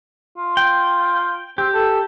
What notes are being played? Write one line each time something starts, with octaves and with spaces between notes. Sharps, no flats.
F4
G5
C4 G4
A4